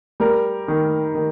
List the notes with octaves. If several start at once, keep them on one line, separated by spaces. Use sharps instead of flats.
G3 A#4
D#3
D#3